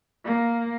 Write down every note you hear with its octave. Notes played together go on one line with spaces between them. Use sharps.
A#3